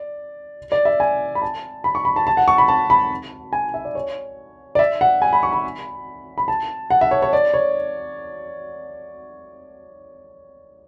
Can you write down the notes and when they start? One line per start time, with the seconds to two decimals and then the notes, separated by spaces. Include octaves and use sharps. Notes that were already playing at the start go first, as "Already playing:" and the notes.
Already playing: D5
0.72 D5
0.85 E5
1.00 G#5
1.35 B5
1.42 A5
1.84 B5
1.95 C#6
2.05 B5
2.16 A5
2.27 A5
2.37 F#5
2.48 C#6
2.58 B5
2.68 A5
2.90 B5
3.53 G#5
3.74 E5
3.85 D5
3.95 C#5
4.75 D5
4.79 E5
5.01 F#5
5.22 G#5
5.33 B5
5.43 C#6
5.53 B5
6.38 B5
6.48 A5
6.90 F#5
7.01 E5
7.11 C#5
7.22 C#5
7.33 D5
7.54 C#5